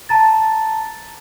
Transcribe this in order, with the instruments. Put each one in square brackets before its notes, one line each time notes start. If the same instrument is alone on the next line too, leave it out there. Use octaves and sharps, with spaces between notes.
[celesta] A5 A#5 A6